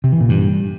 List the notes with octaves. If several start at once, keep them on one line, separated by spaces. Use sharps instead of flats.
C3
E3
A#2
G2